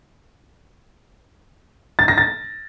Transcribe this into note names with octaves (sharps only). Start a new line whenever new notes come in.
A6
A#6
A6